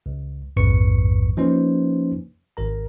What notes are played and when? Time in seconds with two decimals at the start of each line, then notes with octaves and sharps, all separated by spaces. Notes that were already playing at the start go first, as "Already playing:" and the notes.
0.06 C#2
0.56 A#1 F2 G#2 B4 C#6 C#7
1.37 F3 A#3 C#4 D#4 B4 C5
2.57 G#1 A#4 A#5